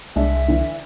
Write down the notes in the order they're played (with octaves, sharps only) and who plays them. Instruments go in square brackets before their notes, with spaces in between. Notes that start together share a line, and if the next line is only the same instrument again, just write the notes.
[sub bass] C2 [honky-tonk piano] G#3 D4 [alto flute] E5
[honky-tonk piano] D3 E3